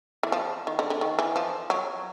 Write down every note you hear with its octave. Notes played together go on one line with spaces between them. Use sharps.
E3
F3
D#3
D3
D3
D#3
E3
F3
F#3